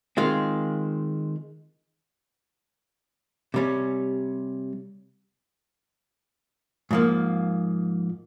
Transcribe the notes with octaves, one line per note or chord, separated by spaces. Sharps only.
D#3 G#3 C4 F4
C3 G3 C#4
G#2 F3 A#3